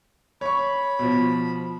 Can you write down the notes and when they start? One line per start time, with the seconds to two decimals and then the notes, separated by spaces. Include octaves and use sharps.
0.41 C#5 B5 C#6
0.99 B2 F3